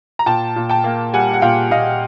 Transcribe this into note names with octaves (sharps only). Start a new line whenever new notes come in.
A#5
A#2 G5 A5
A#2
G5 A5
A#3
G3 F#5 G#5
F#5
A#2 F5 G5
A#2 D#5 F5